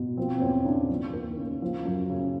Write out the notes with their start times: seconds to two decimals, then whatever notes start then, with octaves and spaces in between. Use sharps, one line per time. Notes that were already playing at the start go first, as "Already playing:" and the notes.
Already playing: B2
0.17 F3 C4
0.38 C4
0.41 E2 C#4
0.65 C#3 D4
0.90 F3
1.13 D#2
1.37 C#3
1.62 F3
1.85 F#2
2.09 C#3